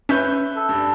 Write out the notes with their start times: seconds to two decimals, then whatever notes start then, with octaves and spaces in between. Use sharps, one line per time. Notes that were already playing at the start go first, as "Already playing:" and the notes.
0.09 C#4 B4 E5 G6
0.56 A4
0.69 G2 D4